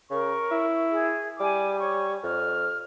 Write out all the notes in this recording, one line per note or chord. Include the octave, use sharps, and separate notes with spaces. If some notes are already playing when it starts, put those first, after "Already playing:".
C#3 A#4 C#6
E4
G#4
G3 G#5 D6
C#5 C#6
F2 F6